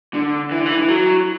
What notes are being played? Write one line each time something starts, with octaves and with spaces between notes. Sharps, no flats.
D3
E3
D3
E3
E3
F#3